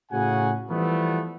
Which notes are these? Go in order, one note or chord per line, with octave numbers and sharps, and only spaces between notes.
A2 C#3 F#4 F#5 G#5
E3 F3 G3 A3 B3